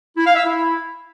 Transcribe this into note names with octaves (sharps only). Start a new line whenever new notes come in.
E4
F5
E5
E4